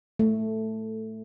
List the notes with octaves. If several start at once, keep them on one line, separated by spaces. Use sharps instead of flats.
A3